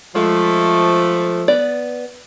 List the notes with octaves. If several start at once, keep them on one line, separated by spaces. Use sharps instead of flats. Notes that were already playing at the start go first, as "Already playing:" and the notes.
F3 G#3 A3
B3 D5